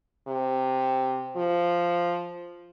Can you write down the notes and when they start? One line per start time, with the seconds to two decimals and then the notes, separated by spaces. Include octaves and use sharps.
0.28 C3
1.36 F3